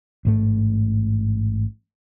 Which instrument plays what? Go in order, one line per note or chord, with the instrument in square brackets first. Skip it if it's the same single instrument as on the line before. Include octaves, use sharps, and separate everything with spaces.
[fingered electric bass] A1 G#2 A3